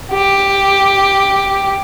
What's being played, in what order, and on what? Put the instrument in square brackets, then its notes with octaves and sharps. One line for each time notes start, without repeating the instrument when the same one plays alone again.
[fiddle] G4